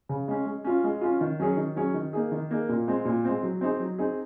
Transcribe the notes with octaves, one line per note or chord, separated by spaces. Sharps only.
C#3
G#3 C#4
G#3
C#4 F4
G#3
C#4 F4
D#3
F#3 C#4 G#4 C#5
D#3
F#3 C#4 G#4 C#5
D#3
A#3 D#4 G#4
D#3
A#3 D#4 G#4
A#2
G#3 C4
A#2
G#3 C4
F#3
C4 D#4 G#4
F#3
C4 D#4 G#4